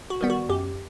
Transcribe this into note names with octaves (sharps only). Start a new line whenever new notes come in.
F#4
D#3 G3 B3
F#4
F#2 G4